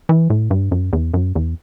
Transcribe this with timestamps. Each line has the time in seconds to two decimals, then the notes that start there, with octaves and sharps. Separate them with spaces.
0.09 E3
0.30 A2
0.51 G2
0.71 F#2
0.93 E2
1.14 F#2
1.35 E2